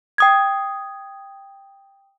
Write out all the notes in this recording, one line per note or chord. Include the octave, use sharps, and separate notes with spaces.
G5 D#6 G#6